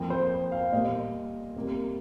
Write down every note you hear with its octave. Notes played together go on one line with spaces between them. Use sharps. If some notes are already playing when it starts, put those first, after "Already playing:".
Already playing: F2 F3 A#3
C5
F5
A#2 G3 A#3 D#5
F2 C3 G3 A#3